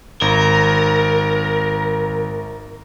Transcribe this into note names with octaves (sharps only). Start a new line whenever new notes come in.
G#1 A#4